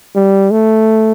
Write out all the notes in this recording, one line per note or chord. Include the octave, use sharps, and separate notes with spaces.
G3
A3